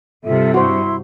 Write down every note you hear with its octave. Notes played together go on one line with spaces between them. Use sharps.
G2 C3 F4 A4 E5
E4 F#4 C5 C6